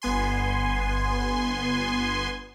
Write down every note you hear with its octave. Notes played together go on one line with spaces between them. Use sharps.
G1 B3 G#5 C6